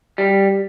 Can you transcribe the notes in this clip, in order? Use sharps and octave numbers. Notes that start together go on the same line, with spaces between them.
G3